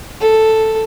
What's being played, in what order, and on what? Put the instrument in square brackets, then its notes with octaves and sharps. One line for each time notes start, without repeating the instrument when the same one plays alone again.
[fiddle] A4